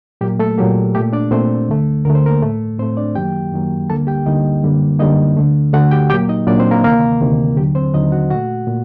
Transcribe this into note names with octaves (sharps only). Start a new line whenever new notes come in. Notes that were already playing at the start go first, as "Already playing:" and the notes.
A#2 F#3 A#3 G4
A3 A4
A#2 F#3 A#3 G4
A#2 A3 G4
D4 D5
A#2 A3 C4 C5
D2 D3 A3
D2 D3 A3 A#4
C5
A#3 A#4
A2 A3
A2 A3 C4 C5
D4 D5
F#2 D#3 F#3 A#3 G4 G5
F#2 D#3 F#3 A#3
D2 D3 G3 A#3 A4 A5
G4 G5
D2 D3 G3 A#3 D#4 D#5
F#2 D3 G3 A#3
F#2 D3 G3 A#3 D#4 D#5
D2 D3 A3
D2 D3 A3 F#4 F#5
G4 G5
A#2 F#3 A#3 G4 G5
D#4 D#5
A#2 F#3 A#3 D4 D5
C4 C5
A#3 A#4
D2 C3 D#3 A#3 A#4
D2 C3 D#3
D#2 D3 F#3 G4
C4 C5
D#2 D3 F#3 D#4 D#5
F#4 F#5
A#2 A3 F#4 F#5
A#2